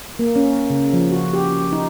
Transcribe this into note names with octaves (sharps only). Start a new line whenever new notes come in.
A#3
C#4
C#3
F3
F#4
G4
D#4